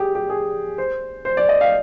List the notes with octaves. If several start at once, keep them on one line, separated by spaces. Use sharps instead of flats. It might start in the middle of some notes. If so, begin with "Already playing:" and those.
Already playing: G4 G#4
G4
G#4
C5
C5
D5
D#5
F5